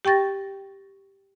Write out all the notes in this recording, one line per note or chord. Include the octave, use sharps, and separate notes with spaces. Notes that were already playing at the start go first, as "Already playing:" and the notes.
G4 G5 C#6 A6 A#6